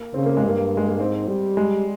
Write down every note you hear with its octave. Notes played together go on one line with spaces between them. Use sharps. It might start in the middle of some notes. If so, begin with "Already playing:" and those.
Already playing: A#3
C#3 C4
A#3
G#3
G2
A#3
G#3
A#3
G#2 C4
G3
G#3